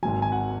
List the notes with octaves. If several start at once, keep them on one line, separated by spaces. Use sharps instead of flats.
G#1 G#2 F#3 G#5
G#5
F#5